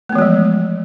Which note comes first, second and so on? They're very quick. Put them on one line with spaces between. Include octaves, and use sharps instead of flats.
A3 B3 E3 G#3 F3